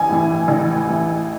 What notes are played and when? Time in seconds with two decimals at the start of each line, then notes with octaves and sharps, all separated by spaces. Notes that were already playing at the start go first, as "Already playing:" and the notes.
Already playing: A1 G#5
0.10 A2 E3
0.48 A1
0.87 A2 E3